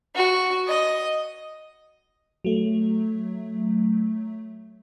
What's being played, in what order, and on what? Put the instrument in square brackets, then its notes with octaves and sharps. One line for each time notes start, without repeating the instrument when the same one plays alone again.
[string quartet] F#4
D#5
[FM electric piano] F#3 A3